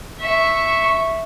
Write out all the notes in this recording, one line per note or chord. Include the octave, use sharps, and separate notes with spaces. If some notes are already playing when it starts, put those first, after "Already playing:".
E5 C#6